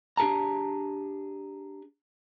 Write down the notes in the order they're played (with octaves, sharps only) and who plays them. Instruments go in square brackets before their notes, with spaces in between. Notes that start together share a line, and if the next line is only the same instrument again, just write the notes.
[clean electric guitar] D4 G4 G#4 A5 A#5